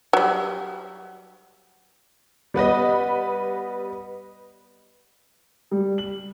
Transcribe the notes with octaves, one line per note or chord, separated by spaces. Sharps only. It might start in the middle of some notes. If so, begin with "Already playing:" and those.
F#3 G3
G3 B3 B4 D#5
G3
F#7